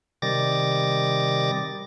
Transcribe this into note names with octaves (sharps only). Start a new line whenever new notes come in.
C3 D#3 G3 D6 A6 A#6